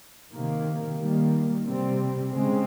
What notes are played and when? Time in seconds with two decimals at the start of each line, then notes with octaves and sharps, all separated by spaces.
0.32 C3 D#3 A#3
0.98 D#3 G3 A#3
1.66 C3 G3 C4
2.32 C#3 G#3 C4